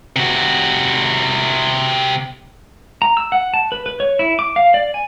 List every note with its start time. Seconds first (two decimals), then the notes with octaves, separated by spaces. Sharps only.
0.16 C3 F#4
3.02 A#5
3.17 E6
3.32 F#5
3.54 A5
3.72 B4
3.86 B4
4.00 C#5
4.19 E4
4.39 D6
4.56 F5
4.74 D5
4.94 G#5